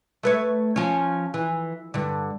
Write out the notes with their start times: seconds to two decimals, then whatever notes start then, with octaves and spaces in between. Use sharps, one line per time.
0.23 A3 B4 C#5
0.76 F3 C#4
1.34 E3
1.94 G2 D3